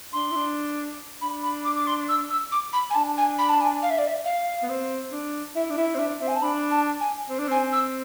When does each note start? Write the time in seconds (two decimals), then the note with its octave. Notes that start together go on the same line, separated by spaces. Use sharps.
0.13 D4 C6
0.31 E4
0.35 D4
1.21 D4 B5
1.43 B5
1.65 D6
1.76 D6
1.87 C6
2.09 E6
2.30 E6
2.52 D6
2.73 B5
2.90 G#5
2.95 D4 A5
3.18 G#5
3.38 B5
3.49 A5
3.61 G#5
3.82 F5
3.90 E5
3.98 D5
4.07 E5
4.25 F5
4.63 B3
4.69 C4
5.12 D4
5.55 E4 E5
5.70 D4
5.77 E4 E5
5.94 C4
5.98 D4 E5
6.20 C4 E5
6.28 G#5
6.36 A5
6.42 D4 B5
6.71 A5
7.00 G#5
7.29 C4
7.39 D4
7.48 C4 G#5
7.73 E6